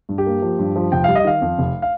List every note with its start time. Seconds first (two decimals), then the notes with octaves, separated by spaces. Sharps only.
0.09 G2
0.18 G4
0.26 A#3
0.42 F3
0.59 G2
0.76 F3
0.92 F1 G5
1.04 G3 F5
1.15 D#5
1.24 D#3 F5
1.41 F2
1.58 F1
1.82 F5